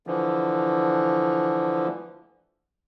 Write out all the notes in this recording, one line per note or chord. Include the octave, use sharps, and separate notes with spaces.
D3 E3 F3